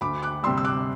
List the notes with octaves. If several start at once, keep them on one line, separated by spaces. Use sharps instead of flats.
D2 B5 D6
D6 F#6
C3 G3 C6 E6
E6
D6 F#6